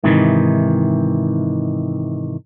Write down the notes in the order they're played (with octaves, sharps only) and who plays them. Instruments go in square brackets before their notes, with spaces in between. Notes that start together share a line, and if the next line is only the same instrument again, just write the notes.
[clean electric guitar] G#2 C3 D#3 E3